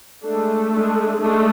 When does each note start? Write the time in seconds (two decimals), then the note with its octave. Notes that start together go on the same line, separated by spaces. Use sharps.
0.25 G#3 A3 D4 A4
0.73 G#3 D4
1.21 G#3 A3 D4 A4